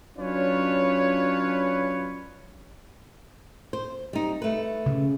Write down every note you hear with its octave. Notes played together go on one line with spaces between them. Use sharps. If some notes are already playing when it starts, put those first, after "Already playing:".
F#3 C#4 D4 F4 B4 C#5
C5
G3 D#4
A3 B4
C#3